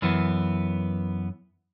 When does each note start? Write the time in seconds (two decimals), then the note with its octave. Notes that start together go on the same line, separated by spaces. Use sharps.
0.02 F#2 E3 B3